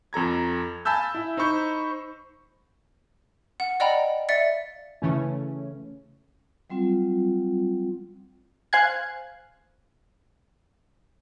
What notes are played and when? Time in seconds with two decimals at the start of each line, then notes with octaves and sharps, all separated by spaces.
0.13 F2 A4 A#5 G#6
0.85 F5 G#5 A5 B5 E6 G6
1.14 E4 E5
1.37 D#4 C5 B5 C#6 G6
3.60 F#5
3.80 D5 D#5 F#5 G5 A#5 B5
4.29 D5 E5 F5 A6 C#7
5.02 C#3 E3 A3 C#4
6.70 F#3 G3 C4 F4
8.73 C5 F5 G#5 F#6 G#6